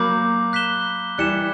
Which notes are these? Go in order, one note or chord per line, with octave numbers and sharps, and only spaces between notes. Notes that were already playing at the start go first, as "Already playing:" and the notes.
Already playing: F#3 A#3 B5 D6 G6
F#6 B6 E7 G7
E3 G3 F#6 C#7 E7